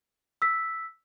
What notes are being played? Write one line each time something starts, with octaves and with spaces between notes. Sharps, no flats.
E6 B6